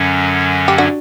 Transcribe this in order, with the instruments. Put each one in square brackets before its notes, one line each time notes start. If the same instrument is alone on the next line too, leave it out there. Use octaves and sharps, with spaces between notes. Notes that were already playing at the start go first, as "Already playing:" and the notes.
Already playing: [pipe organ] F#2 D3 F#3 C#4
[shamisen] G4
D4 F#4